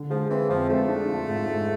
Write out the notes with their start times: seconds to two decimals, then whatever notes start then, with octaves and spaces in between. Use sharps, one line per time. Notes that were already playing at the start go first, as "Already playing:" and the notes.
Already playing: D3
0.10 F3 G#3
0.30 E3 C4
0.49 F2 F3
0.69 G#3 A3
0.89 D4
1.08 F4
1.28 G#2
1.47 G#3